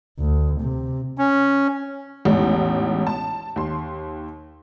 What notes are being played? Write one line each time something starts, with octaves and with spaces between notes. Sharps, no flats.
D2
C3
C#4
A1 E2 G#2
A5
D#2 C6